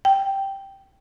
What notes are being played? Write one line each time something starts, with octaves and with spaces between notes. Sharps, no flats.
G5